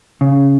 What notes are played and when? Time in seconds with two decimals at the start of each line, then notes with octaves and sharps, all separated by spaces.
0.21 C#3